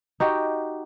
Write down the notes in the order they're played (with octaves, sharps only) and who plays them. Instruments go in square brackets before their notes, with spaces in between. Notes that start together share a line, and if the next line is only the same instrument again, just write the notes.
[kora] D#4 F#4 G4